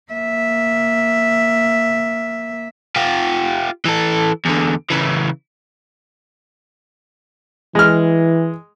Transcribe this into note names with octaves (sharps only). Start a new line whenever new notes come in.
A#3 E5
F4 G4
E3 A4
E2 D3
C#3 E3
E3 G#3 F6